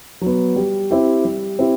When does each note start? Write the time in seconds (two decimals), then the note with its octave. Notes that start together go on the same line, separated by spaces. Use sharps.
0.21 F#3 B3
0.56 G3
0.91 C4 E4 G4
1.25 G3
1.59 C4 E4 G4